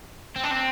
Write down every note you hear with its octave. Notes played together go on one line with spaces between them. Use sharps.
C4
D4
C4